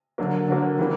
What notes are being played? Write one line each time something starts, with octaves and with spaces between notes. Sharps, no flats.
D3 F#3 A#3
D3 F#3 A#3
E3 G3 A#3